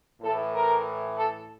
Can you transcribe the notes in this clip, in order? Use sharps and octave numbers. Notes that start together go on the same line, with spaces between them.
A2 E3 A4
A#4
A4